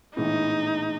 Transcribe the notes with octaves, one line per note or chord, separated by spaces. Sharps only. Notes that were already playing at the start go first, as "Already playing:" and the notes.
A#1 A2 E3 G#3 B3 D#4